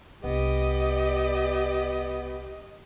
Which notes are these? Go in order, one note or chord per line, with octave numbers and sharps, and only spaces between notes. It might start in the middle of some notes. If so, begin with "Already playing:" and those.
C2 B3 D4 G4 D#5